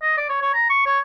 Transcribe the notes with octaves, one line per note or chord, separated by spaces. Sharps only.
D#5
D5
C#5
C#5
A#5
C#6
C#5